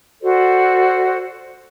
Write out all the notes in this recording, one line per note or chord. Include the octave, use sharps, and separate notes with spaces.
F#4 A4 C5 D5